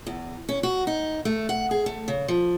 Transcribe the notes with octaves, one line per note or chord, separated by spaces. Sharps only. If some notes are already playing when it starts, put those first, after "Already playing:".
E2
C#4
F#4
D#4
A3
F#5
G#4
A3
C#3
F3